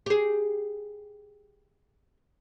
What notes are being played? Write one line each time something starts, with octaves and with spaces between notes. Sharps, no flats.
G4 G#4